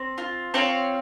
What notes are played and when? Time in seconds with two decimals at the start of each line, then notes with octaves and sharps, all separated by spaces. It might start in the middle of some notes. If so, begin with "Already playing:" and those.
Already playing: C4
0.18 F4
0.54 C4 C#5 F5